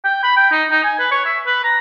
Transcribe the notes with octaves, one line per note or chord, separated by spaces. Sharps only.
G5
B5
G5
D#4
D#4
G#5
B4
C#5
E5
B4
A#5